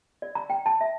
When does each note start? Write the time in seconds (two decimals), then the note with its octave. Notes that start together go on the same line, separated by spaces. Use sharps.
0.22 D5
0.35 A#5
0.50 G5
0.66 A5
0.81 E5